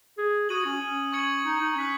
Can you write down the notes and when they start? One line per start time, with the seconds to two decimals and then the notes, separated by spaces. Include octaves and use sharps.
0.18 G#4
0.49 F#4 D#6 G#6 D#7 F#7
0.65 C#4
0.81 C#4
1.13 C#6 G#6 C#7 F#7
1.45 D#4
1.60 D#4
1.76 C#4 F#6 B6 F#7